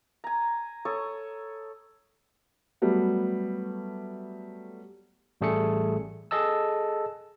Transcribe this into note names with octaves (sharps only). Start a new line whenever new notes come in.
G#5 A#5
A4 C#5 C#6 D#6
F#3 G3 A3 B3
A1 G3 A3 G#4 A4 C#7
G#4 A4 D#5 A5 E6